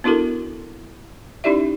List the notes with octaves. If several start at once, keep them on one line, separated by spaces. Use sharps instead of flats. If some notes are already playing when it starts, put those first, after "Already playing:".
B3 D4 E4 F#4 A4 A#4
C#4 D#4 E4 G4 D5 E5